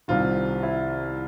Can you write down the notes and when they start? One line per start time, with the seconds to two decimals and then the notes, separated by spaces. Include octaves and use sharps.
0.08 C2 C3 D#3 F4
0.63 E4